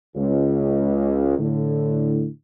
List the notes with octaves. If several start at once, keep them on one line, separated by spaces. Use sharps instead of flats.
C#2
A2 D3